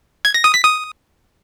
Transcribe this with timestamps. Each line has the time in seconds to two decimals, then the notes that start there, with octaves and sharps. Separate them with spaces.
0.25 G#6
0.34 A#6
0.44 D#6
0.54 B6
0.64 D#6